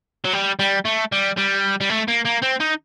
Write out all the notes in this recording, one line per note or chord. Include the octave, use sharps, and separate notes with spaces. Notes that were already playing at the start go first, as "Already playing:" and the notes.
F#3
G3
G3
A3
G3
G3
G3
A3
A#3
A#3
C4
D#4